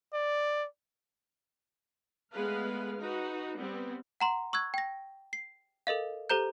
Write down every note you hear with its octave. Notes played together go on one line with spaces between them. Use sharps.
D5
G#3 A3 B3 B4 F5
D#4 F#4 B4
G3 B3 C4
F#5 A#5 C6
C#6 E6 F#6 G#6
G5 A#6
C7
A4 A#4 D#5 F5
G4 A4 C5 A#5 G6